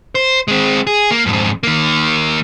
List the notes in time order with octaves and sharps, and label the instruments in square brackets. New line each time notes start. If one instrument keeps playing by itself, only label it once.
[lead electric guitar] C5
G#3 C4
G#4
A#3
F2 G#2
D#3 A#3